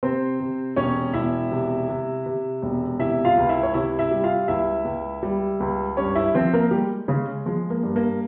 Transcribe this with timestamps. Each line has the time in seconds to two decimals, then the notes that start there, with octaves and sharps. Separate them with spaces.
0.03 C3 C4 C5
0.40 C3
0.76 E1 C#4 C#5
1.13 E1 E4 E5
1.51 C3
1.89 C3
2.26 C3
2.62 E1
2.99 C3 E4 E5
3.25 F4 F5
3.38 C#2
3.49 E4 E5
3.63 C#5
3.74 C3 E4 E5
3.99 E4 E5
4.11 G3
4.23 F4 F5
4.48 C#2 E4 E5
4.85 C#2
5.23 G3
5.60 C#2
5.97 G2 C#4 C#5
6.15 E4 E5
6.34 F3 C4 C5
6.53 A#3 A#4
6.71 G3 G#3 G4
7.08 C#3 G#3 C#4
7.46 F3 G#3
7.70 A#3
7.83 G2
7.96 A#3